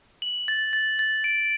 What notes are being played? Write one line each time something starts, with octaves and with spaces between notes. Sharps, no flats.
F#7
A6
A6
A6
D7